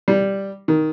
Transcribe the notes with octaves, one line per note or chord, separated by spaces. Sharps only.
G3
D#3